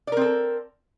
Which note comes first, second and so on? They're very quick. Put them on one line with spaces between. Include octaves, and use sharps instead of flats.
D5 A#4 C4 A4